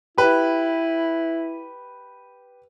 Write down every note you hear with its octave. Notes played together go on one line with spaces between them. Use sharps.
E4 G4 B4